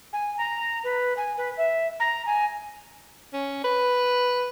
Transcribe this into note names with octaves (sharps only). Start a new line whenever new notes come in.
G#5
A#5
B4
G#5
B4
E5
A#5
G#5
C#4
B4